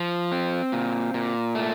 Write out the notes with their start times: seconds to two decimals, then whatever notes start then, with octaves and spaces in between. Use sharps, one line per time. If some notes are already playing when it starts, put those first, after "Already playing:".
Already playing: F3
0.32 C4
0.72 A#2
1.14 A#2
1.55 A3